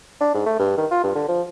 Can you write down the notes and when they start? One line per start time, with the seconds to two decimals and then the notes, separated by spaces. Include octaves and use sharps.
0.21 D4
0.35 G#2
0.46 A3
0.59 G2
0.78 D#3
0.91 F4
1.04 G2
1.15 D3
1.28 F3